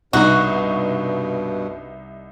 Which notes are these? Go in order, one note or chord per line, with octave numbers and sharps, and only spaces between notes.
C2 G2 B2 D#4 F#4 C#6